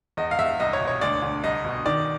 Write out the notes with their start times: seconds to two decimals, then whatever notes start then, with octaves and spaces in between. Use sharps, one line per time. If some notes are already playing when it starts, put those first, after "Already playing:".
0.17 E2 D#5
0.31 F5
0.38 E2 E5
0.60 C2 D#5
0.73 C#5
0.80 B2
0.87 C#5
1.01 D2 D5
1.22 D2
1.43 C2 D#5
1.65 B2
1.86 D#3 D5